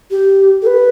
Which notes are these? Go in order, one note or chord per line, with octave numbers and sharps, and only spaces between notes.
G4
A4
B4